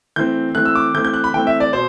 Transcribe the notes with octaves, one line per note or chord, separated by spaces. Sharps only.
E3 A3 C4 G6
E3 A3 C4 F#6
E6
D6
E3 A3 C4 G6
G6
F#6
B5
E3 A3 C4 G5
E5
D5
B2 C5